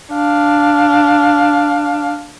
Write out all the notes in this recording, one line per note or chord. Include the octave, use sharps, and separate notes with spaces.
D4 F5